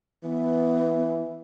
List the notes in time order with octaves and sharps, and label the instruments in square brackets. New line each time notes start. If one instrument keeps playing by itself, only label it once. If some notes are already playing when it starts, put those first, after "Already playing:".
[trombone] E3 [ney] B3